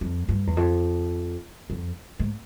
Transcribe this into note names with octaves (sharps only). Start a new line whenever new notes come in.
F2
G2
E2
F2
F2
G#2